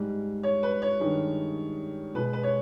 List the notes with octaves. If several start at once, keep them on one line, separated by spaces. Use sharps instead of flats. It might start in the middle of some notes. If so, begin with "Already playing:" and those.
Already playing: G#2 G3
C#5
B4
C#5
G2 D#3 G#3
B2 G#3 B4
B4
C#5